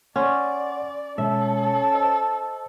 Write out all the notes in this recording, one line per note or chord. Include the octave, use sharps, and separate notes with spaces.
C#4 D5 F#5 C6
B2 G#3 C#4 A4 E5
C5 D#5 E6